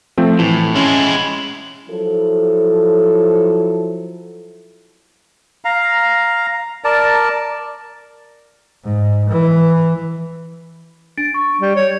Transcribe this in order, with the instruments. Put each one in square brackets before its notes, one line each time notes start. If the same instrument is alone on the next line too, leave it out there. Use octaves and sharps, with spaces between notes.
[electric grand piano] F3 A3 C4
[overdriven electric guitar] A2 [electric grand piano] E3
[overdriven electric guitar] G#3 E4 [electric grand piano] C#4
[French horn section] F3 F#3 E4 A4
[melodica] F5 A#5
A#4 D5 A5
[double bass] G#2
E3
[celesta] D4 A6 D7
C#6
[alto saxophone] G3
C#5